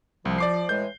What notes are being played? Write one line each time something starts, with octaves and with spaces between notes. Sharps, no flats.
C2 F3
D5 D6 C7
A2 E3 G#3 G6